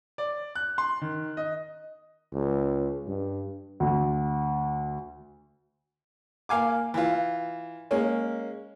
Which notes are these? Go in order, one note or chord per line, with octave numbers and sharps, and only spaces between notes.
D5
F#6
C6
D#3
D#5
C#2
G2
D2
A#3 F5 G#5 D6
E3 F4
G#3 A#3 C#4